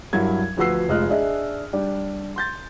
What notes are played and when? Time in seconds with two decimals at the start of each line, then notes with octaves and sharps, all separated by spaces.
0.13 G2 F#3 E4 A#4 G#6
0.57 D2 F3 F#4 B4 E6 C7
0.88 F1 G#3 F4 D#5 F6 F#6
1.10 D4 G#4 D#5 E5
1.73 G3 D4 G4
2.36 C6 G6 A6